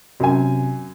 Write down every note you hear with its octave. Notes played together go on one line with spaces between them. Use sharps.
F#2 C3 G#5